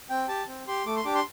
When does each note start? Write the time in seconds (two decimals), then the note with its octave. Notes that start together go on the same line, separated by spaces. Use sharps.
0.10 C4 G5
0.28 G4 A5
0.48 C4
0.67 G4 C6
0.85 A3 D6
0.96 C6
1.05 D4 G4 D6
1.15 C6